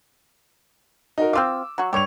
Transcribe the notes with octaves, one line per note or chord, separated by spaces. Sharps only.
D#4 F#4 A#4
C4 F4 F5 D6 E6
F#3 F#4
G2 G4 C#5 F7